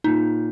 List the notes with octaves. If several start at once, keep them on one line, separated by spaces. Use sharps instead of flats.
A#2 D#4